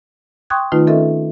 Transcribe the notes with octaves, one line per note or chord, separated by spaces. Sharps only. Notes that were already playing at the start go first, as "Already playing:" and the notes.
G5 C6 C#6 D#6 F#6 G#6
D#3 A3 D#4 F4 B4
C4 C#4 A4 A#4 D#5 E5